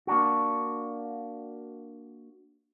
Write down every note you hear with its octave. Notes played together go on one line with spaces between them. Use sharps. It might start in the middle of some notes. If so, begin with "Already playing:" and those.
A#3 D4 F#4